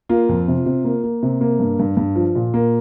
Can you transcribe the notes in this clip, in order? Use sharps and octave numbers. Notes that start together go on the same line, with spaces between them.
A#3 F4
F2
C3
C3
A#3
A#3
C3
A#3
G2
G2
G2
F3
A#2
A#3